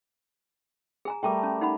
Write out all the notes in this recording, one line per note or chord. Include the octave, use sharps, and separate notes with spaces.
G#4 G#5 A#5
G3 A3 A#4 G5 A5 D6
C#4
D#4 F#5 B5